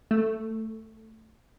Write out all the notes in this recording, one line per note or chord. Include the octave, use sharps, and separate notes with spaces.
A3